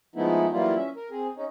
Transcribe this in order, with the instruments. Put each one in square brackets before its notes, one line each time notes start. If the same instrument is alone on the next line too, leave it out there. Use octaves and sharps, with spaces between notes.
[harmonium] F3 G#3 A3 B3 D#4 E4
E3 F#3 G3 A#3 E4 F4
C#4 E5
A#4
C4 G#4
C#4 D#4